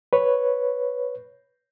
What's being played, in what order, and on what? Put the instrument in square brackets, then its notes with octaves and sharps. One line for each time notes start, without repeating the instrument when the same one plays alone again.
[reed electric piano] B4 C#5